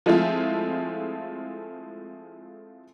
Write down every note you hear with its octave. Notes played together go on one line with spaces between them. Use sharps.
F3 G#3 A3 C4 E4 F4